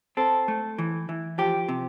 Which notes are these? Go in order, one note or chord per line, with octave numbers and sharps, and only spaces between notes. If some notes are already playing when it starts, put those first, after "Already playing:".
C4 A4
A3
E3
E3
F3 G4
C3